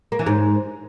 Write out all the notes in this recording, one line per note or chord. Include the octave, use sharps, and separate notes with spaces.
A#3
E3
G#2